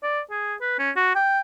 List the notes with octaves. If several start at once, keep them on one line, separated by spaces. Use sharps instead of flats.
D5
G#4
B4
C#4
F#4
G5